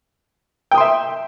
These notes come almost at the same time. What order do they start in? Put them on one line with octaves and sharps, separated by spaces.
G5 D#6 C6 E5